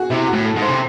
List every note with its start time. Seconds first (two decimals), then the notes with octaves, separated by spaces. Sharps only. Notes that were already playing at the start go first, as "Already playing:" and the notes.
Already playing: F#4 G#4
0.10 C3 E4
0.27 F#4
0.33 A2
0.45 A4
0.56 G#2
0.62 C5
0.68 C3